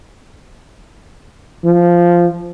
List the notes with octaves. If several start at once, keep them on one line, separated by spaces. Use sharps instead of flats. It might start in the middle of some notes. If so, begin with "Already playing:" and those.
F3